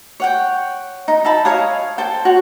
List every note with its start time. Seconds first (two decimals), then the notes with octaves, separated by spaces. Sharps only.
0.20 C#5 F#5 G5
1.08 D#4
1.25 D#4 E5 A5 B5
1.45 C#5 F5 G#5 D#6
1.98 A4 C5 G5
2.25 F#4 C#5